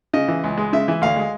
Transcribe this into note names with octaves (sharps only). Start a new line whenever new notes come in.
C#3 D#5
E3
C#2
G#3
C#3 E5
E3
D2 F5
G#3